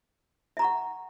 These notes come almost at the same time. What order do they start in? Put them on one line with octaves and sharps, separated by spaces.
E5 A#5 C#6 F#5